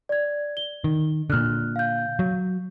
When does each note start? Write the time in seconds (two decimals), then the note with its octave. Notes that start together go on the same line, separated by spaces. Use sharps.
0.09 D5 G#6
0.57 G7
0.84 D#3
1.30 A#2 D3 F6 F#6
1.76 F5 G6
2.19 F#3